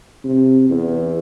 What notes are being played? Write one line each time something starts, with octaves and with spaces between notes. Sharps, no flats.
C3
E2